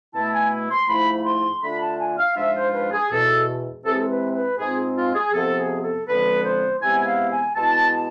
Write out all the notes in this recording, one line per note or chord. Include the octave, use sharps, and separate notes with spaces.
B2 A3 E4 A5
G#5
C6
G#2 F3 A3 E4 B5
B5
C6
D3 A3 D4 F4 B5
A5
G#5
F5
G#2 F3 G#3 D4 F4 E5
C5
B4
G#4
E2 B2 G#3 A4
C3 E3 G#3 C4 A4
G#4
A4
B4
B4
G#2 G#3 C4 F4 G#4
F4
G#4
F2 C3 F3 B3 A4
G#4
A4
F2 D3 F3 G#3 B3 B4
C5
E2 C3 G#3 B3 E4 G#5
F5
G#5
B2 G#3 B3 E4 A5
A5